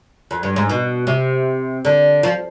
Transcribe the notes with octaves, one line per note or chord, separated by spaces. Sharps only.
F2
G2
G#2
B2
C3
D3
F3